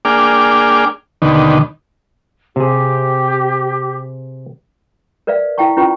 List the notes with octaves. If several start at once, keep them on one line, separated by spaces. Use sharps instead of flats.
A#3 D4 G#4 G5 D6 F6
D#2 B2 D3 D#3
C3 G4 G#4
A#4 B4 D5 E5 F5
E4 F5 G5 A5 C#6
C#4 E4 F4 B4 G5 C#6